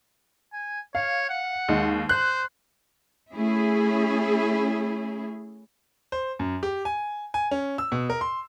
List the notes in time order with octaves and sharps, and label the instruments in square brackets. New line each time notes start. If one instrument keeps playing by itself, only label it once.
[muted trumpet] G#5
[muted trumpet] C#5 [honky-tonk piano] F5
[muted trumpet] F#5
[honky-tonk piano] D#2 G#3
[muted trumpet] C5 [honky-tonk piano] F#6
[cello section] A3 C#4 E4 G#4
[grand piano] C5
F#2
G4
G#5
G#5
C#4
E6
B2
A#4
C6